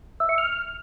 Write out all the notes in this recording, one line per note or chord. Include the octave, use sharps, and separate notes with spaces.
E5
C#6
F6